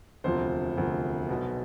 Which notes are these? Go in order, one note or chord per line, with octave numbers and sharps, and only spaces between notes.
E1 D2 C3 F3 C5
E1 D2 C3 F3
B1 B2 B3